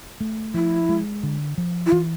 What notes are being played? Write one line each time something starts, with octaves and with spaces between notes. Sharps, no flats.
A3
F3 E4
G#3
D3
F3
E4
E3 F4